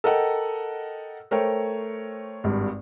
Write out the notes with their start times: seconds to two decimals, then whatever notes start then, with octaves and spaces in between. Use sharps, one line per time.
0.04 A4 A#4 D#5 F#5 G5
1.31 A3 A#4 C5 C#5 G5
2.44 G#1 G2